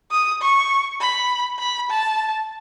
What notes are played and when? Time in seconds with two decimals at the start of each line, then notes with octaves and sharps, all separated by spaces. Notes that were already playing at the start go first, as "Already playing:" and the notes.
0.11 D#6
0.41 C#6
1.00 B5
1.59 B5
1.90 A5